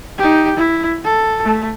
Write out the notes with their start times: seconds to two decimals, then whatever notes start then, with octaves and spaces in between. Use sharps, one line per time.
0.18 D#4 G4
0.57 E4
1.04 A4
1.44 A3